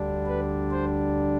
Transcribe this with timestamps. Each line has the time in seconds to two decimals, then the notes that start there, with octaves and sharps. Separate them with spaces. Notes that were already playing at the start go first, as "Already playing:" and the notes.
Already playing: D2 D3 G3 D4
0.26 B4
0.71 C5